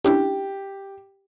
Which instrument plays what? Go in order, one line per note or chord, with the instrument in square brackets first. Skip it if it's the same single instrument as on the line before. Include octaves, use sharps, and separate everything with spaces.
[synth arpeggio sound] C#4 D4 E4 [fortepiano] G4